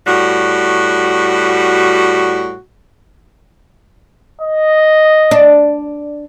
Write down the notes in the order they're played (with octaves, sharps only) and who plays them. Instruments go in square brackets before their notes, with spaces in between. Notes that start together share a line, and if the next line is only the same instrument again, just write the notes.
[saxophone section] A2 G3 F#4
[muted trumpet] D#5
[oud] D4